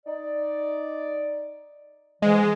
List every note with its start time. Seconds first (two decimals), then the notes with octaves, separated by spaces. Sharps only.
0.06 D#4 D5
2.22 G#2 E3 G#3